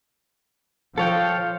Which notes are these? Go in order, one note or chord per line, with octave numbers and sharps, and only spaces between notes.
F3 A4 C#5 F5 G5